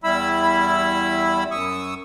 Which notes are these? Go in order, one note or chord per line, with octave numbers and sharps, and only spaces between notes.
E2 G3 E4 B5 E6
F#2 C#6 D#6 E6